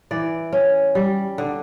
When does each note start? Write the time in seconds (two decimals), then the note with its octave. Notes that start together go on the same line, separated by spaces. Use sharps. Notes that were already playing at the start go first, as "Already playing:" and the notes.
0.11 E3 D5
0.53 C#4
0.95 G3
1.38 D3